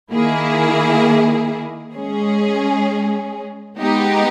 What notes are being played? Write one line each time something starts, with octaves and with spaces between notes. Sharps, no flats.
D#3 A#3 E4 G#4
G#3 C#4 G#4
G#3 B3 D#4 G4